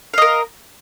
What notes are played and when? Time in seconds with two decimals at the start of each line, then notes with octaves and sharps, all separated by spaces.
0.14 F5
0.18 D#5
0.22 A#4